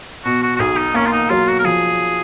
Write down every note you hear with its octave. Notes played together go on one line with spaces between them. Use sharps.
B2 F#4
F#4
F#4
B1 G#4
D#4
A#3 C#4
F4
D#4
F#3 F4
F#4
A#4
F3 G#4